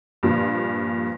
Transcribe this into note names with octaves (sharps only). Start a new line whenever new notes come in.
G2 A#2 F3